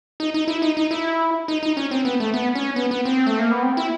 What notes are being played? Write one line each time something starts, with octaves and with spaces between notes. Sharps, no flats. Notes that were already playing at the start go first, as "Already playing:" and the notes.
D#4
D#4
E4
D#4
D#4
E4
D#4
D#4
C#4
C4
B3
A3
B3
C#4
B3
B3
C4
A3
A#3
B3
C4
E4